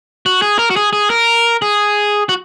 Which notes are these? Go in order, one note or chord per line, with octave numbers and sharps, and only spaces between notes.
F#4
G#4
A#4
F#4
G#4
G#4
A#4
G#4
F#4